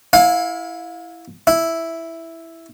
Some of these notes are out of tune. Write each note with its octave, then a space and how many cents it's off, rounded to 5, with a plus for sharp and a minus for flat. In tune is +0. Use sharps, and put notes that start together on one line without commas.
E4 +0 F5 +30 G#5 +0
E4 +0 E5 +0